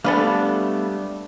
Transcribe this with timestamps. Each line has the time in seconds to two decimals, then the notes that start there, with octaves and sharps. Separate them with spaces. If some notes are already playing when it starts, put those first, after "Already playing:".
0.04 G3 A3 B3 D4 A4 B4 F5